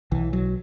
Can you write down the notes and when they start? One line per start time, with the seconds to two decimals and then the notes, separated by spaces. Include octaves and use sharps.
0.12 B1 E3
0.33 F#3